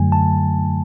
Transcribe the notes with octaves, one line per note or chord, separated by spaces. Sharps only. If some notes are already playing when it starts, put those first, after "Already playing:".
Already playing: F#2 D3 F#3 A3 G#5
A5